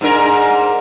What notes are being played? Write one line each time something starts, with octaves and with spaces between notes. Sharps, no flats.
G#2 D4 A#4